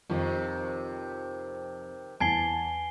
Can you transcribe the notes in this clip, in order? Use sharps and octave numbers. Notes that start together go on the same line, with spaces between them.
F2 C3 D#3
E2 G#5 A5 G#6 C7 G7